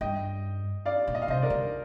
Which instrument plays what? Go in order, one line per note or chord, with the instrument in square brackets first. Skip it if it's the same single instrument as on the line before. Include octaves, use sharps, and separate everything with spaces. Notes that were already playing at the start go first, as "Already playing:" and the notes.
[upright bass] G2 [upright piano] D#5 G5
[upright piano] D5 F5
[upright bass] A#2
[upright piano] D#5
F5
[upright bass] C3 [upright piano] C5 D#5
[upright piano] A#4 D5
[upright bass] D3